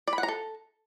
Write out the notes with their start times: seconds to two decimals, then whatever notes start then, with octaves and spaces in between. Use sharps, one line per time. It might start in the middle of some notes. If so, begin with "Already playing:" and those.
0.07 D5
0.13 B5
0.18 F#5
0.23 A#5
0.28 A4